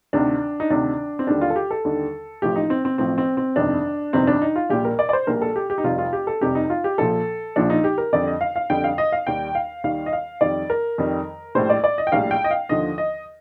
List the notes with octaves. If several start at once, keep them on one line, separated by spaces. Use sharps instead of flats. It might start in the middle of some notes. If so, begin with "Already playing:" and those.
D2 C3 D#3 D4
D#4
D2 C3 D#3 D4
C4
D#2 D3 G3 D4
F4
A4
G4
A4
D#2 D3 G3
A1 A2 F3 G4
D#4
C4
C4
A1 A2 F3 C4
C4
C4
G1 F2 C3 D#3 D4
G1 F2 C3 D#3 C4
D4
D#4
F4
A#1 A#2 G3 G4
A#4
D5
D5
C5
A#1 A#2 G3 A#4
A4
G4
G4
D#4
F1 F2 C3 G3 F4
F4
G4
A4
F1 F2 C3 G3 G4
D#4
F4
G4
A#1 A#2 F3 A4
A#1 A#2 F3 D4
D#4
G4
A#4
F2 D3 G3 D5
D#5
F5
F5
F2 D3 G3 G5
F5
D#5
F5
D#2 D#3 G3 G5
F5
D#2 D#3 G3 F5
D#5
F5
F2 D#3 G3 D5
A#4
F2 D#3 G3
A#1 A2 G3 C5
D5
D5
D#5
G5
A#1 A2 G3 F5
G5
D#5
F5
D#2 D3 F3 D#5
D#5